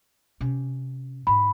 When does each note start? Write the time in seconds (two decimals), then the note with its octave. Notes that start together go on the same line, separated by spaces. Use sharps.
0.41 C3 C#4
1.27 G#2 D3 B5